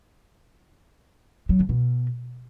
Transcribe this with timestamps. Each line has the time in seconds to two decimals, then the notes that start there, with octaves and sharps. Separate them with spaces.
1.49 F#3
1.59 D3
1.69 B2